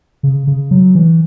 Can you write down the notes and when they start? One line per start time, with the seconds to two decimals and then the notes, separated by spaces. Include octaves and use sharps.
0.23 C#3
0.47 C#3
0.71 F#3
0.95 E3